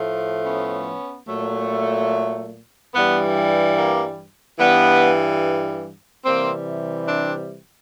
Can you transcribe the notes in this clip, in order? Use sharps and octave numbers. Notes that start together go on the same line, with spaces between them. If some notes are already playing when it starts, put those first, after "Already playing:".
Already playing: A2 F3 A3
B3 C#4
A#2 F#3 A3
G2 E3 G3 B3
A#3
G2 E3 G3 B3
C3 E3 G3 A#3 C4
C4 D4